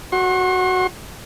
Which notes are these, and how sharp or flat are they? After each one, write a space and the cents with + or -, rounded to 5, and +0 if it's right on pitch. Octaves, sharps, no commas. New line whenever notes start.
F#4 +0 C6 +45